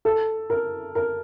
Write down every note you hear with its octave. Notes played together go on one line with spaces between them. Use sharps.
A4
A#4
A#4